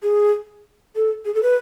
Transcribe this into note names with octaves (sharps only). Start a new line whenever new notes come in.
G#4
A4
G#4
A4
B4